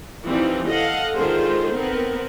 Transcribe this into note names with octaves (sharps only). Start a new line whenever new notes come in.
E3 F3 G3 C4 D#4
A4 D#5 F5 F#5
D3 D#3 G#3 F4 G#4 C5
B3 C4 A#4